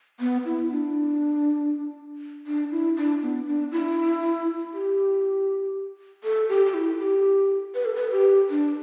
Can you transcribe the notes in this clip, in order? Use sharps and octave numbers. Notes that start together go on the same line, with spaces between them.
B3
E4
D4
D4
E4
D4
B3
D4
E4
G4
A4
G4
G4
E4
G4
B4
A4
B4
G4
D4